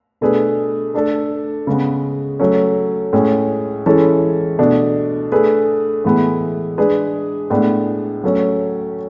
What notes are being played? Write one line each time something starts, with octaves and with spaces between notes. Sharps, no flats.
B2 A3 D4 G#4 B4
A3 D4 A4
C#3 G#3 B3
F#3 A3 C#4
A2 G#3 C#4 G#4
E3 G#3 C#4 E4 A4
B2 A3 D4
A3 D4 G#4 B4
A2 E3 G#3 B3 E4
G#3 D4 G#4 B4
A2 G#3 B3 D4
F#3 A3 C#4